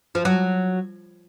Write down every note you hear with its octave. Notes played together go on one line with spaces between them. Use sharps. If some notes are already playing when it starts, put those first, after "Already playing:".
F3
F#3